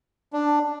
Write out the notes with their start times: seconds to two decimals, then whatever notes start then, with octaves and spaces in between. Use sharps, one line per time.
0.33 D4